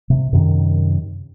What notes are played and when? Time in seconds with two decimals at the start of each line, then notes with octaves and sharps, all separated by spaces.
0.10 C3
0.33 F#2 C3 D#3